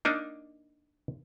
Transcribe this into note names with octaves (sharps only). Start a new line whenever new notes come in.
A#3 D4 D#4